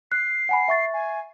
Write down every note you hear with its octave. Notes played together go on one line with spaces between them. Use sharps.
F#6 C7
F#5 G#5 B5
E5 C#6 A6
G#5